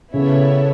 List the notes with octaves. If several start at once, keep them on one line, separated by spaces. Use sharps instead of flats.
C#3 B3 E4 A4 C#5 E5